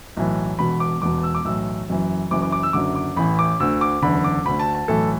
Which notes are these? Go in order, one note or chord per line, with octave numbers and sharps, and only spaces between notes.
B1 A2 E3
E1 E2 B2 B5
D6
E1 E2 B2 D6
E6
D6
B1 A2 E3 E6
F#1 F#2 E3
F#1 F#2 E3 D6
D6
D6
E6
F#1 F#2 D3 D6
D6
A1 A2 E3 B5
D6
D2 D3 E6
D6
F#1 E2 D3 B5
D6
D2 D3 B5
A5
A5
B1 A2 E3 A4